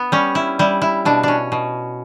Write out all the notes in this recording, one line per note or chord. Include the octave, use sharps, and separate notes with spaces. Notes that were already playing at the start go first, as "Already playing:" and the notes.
Already playing: B3
G3 C#4
E4
G3 E4
E4
B2 D4
C#4 D4
B2